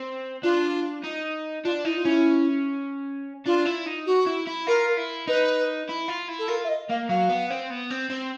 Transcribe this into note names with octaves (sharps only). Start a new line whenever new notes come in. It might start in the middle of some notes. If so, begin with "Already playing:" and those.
Already playing: C4
D4 F4
D#4
D4 F4
D#4 E4
F4
C#4 E4
D4 F4
E4
D#4
F#4
E4
E4
F4 A#4
E4
D#4 B4
E4
F4
E4
A4
F4 A#4
E5
D#5
A#3 F5
F#3 F5
B3
C4
B3
C4
C4